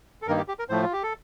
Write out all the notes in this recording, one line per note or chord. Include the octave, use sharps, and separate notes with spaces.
A4
G2 D#3 A#3 D#4 A#4
G4
G4
A#4
A2 F3 A3 C5
F4
G4
A4